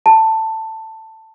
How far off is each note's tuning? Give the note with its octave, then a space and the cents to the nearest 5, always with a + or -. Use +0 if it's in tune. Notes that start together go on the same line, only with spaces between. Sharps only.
A5 +15